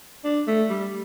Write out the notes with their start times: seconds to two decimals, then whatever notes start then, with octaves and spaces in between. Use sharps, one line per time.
0.24 D4
0.47 A3
0.69 G3